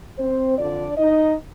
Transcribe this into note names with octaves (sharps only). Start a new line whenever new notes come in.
C4 C5
F2 D3 F3 D4 D5
D#4 D#5